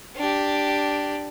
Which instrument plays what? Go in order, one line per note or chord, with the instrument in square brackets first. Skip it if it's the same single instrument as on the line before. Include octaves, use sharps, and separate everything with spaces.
[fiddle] D4 G4